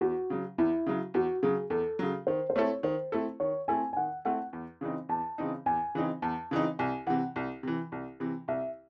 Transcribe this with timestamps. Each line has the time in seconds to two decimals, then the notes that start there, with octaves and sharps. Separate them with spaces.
0.01 E2 F#4
0.30 C#3 F#3
0.58 E2 E4
0.86 C#3 F#3
1.14 E2 F#4
1.43 C#3 F#3 G#4
1.70 E2 A4
1.99 C#3 F#3
2.27 D#3 C5
2.50 C5
2.56 A3 C4 E4 A4 C#5
2.83 D#3 C5
3.12 A3 C4 E4 A4
3.40 D#3 C#5
3.68 A3 C4 E4 A4 G#5
3.93 G#5
3.96 D#3 F#5
4.25 A3 C4 E4 A4 F#5
4.53 E2
4.81 C#3 E3 C4 D#4
5.09 E2 A5
5.38 C#3 E3 C4 D#4
5.66 E2 G#5
5.95 C#3 E3 C4 D#4
6.22 E2 A5
6.51 C#3 E3 C4 D#4
6.79 C2 G#5
7.07 C3 E3 F#5
7.36 C2
7.63 C3 E3
7.92 C2
8.20 C3 E3
8.48 C2 E5